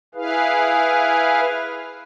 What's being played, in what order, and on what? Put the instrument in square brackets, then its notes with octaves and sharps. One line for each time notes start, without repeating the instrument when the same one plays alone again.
[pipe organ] E4 G#4 B4 F5